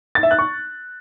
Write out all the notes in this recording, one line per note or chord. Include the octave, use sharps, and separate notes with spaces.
A6
E5
F#6
C#6